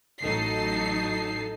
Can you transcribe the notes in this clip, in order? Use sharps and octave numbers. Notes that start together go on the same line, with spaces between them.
A1 F#3 D#4 A4 C7